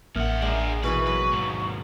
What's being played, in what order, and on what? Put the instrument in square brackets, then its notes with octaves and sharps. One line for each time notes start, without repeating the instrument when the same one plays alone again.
[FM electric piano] A1 A#3 F6 [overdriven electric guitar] F2 F#5 [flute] E5
[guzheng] G#3 [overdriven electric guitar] D4 A#4
[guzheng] B2 E3 B5 [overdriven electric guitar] B4 [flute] C#6
[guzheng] F#3 [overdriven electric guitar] B4
[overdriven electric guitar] D#2 G#2